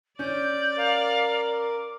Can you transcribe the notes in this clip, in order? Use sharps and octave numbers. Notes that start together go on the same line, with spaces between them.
C#4 D5 G6
A#4 F5
D6